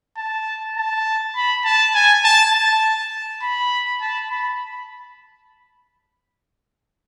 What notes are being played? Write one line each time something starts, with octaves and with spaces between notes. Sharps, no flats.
A5
A5
B5
A5
G#5
A5
A5
B5
A5
B5